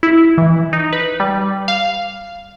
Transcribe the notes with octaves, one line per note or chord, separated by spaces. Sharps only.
E4
E3
D#4
B4
G3
F5